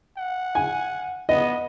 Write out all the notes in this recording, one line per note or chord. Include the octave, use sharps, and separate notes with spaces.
F#5
G#5
B3 D#5